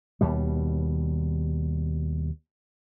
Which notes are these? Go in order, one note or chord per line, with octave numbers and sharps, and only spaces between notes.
D#2 B2 G3